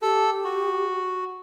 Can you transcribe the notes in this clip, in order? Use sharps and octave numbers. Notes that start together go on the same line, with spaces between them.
G4 A4
F#4